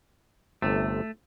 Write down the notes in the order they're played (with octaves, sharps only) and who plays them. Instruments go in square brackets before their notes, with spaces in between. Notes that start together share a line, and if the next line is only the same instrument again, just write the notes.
[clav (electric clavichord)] G1 C3 [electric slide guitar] A3